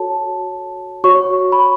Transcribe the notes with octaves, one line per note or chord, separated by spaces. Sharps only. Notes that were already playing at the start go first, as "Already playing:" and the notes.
Already playing: F#4 A4 C#5 A5
F#4 C#5 C#6
B5